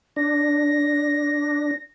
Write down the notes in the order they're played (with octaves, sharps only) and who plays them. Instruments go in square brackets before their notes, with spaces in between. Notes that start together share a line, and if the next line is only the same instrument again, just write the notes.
[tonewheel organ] D4 [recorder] A#6